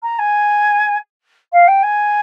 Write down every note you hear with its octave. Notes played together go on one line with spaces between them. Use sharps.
A#5
G#5
F5
G5
G#5